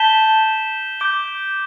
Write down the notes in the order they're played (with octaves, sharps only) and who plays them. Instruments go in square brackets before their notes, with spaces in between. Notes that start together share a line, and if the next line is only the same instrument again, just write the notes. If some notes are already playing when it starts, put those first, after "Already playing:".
Already playing: [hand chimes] A5 [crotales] G6 B6 E7 G7
[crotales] D6 G6 D7 G7